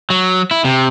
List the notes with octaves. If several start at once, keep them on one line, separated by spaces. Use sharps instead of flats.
F#3
E4
C3